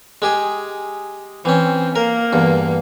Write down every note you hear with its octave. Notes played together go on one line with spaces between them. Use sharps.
G#3 G4 G#4
E3 C4 C#4
A#3 A#4
E2 G2